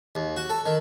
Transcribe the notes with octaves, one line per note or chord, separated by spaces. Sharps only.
D#2
F#4
A4
D#3